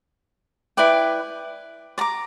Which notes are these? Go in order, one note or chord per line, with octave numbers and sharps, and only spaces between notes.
E4 B4 D5 G5
D5 A#5 D6